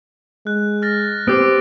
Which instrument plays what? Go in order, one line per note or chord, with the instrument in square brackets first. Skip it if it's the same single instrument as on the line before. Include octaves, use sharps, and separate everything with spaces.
[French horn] G#3 [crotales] F#6
[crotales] F6 A6 A#6
[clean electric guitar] B3 G4 C5 [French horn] C4 [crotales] D6 E6 D7